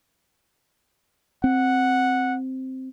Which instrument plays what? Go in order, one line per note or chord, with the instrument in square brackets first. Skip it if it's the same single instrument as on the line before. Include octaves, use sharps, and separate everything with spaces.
[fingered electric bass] C4 [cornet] F#5